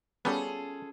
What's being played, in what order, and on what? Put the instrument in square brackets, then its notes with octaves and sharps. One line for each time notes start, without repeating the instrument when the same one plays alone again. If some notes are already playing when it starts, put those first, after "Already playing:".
[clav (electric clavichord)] G3 B3 [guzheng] C#4 [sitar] F4 G#4 A4